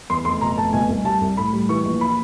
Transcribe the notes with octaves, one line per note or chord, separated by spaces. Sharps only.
E2 C6
F1 C6
B2 A#5
F1 A5
B2 G#5
C2
G3 A5
C2
A2 B5
G3
E3 C#6
A#1
B5